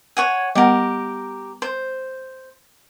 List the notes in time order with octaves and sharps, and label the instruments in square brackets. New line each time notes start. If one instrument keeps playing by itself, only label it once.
[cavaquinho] C#5 F#5 G#5
[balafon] G3 B3 F#5 [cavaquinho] G4 A#4
[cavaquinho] C5